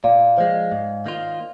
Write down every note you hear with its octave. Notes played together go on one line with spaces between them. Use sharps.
A#2 D5 F5
F3 G#3 C5 D#5
G#2
D#3 A#3 F4